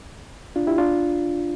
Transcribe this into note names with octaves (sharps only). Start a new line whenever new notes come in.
D4 F4
E4 G4
D4 F4